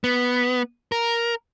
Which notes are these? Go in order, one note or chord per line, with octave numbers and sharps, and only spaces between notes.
B3
A#4